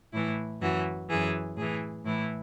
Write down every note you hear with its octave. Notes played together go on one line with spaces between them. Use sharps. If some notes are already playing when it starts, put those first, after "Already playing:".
A2 E3 E4
F#2 E3 F#4
F#2 E3 G#4
A2 E3 G#4
A2 E3 E4